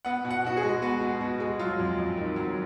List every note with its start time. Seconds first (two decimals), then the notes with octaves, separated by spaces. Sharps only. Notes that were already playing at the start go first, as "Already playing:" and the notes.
0.05 B3 F#5
0.25 B2
0.31 F#5
0.44 B2 F#4
0.57 G#4
0.63 G#3
0.82 B3 F#4
1.01 B2
1.21 B2
1.40 G#3
1.59 F#3 F4
1.79 F2
1.98 F2
2.17 D#3
2.36 F#3